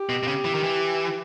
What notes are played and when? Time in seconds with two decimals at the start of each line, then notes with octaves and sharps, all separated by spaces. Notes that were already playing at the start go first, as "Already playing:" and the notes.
Already playing: G4
0.09 B2
0.23 B2
0.27 C#3
0.45 E3
0.54 D#3
0.63 E3